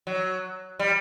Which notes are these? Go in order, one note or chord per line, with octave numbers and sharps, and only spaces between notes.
F#3
G3